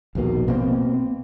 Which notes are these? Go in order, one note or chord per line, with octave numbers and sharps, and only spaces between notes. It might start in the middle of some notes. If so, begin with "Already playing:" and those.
A#1 D#2 B2 A#3
B2 A#3 C4